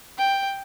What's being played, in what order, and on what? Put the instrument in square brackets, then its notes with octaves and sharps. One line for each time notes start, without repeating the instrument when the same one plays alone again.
[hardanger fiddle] G5